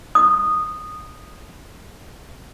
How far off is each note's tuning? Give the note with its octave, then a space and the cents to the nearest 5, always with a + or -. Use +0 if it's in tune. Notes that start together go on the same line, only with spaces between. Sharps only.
D#6 -10